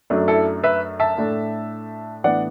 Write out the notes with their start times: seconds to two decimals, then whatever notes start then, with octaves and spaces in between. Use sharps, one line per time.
0.10 F#2 F#3 A3 D4
0.28 E4 A4
0.63 B4 E5
1.00 E5 A5
1.17 A2 A3 D4
2.24 A2 E3 B3 D4 D5 F#5